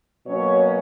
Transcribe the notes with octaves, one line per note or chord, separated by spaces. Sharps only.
B2 F#3 A#3 C#4 C#5